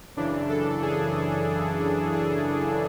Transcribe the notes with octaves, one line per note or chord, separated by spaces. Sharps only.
F#2 C#3 E3 D4
A4
G#4
G#4